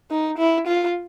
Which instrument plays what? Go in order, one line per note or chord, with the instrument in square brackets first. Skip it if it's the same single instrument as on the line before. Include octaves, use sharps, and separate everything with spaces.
[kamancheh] D#4
E4
F4